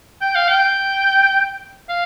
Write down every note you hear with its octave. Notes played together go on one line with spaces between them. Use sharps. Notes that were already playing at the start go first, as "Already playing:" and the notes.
G5
F5
G5
F5